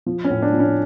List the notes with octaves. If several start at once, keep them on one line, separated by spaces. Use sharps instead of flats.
F3
C#4
A2
D4
F3
C#4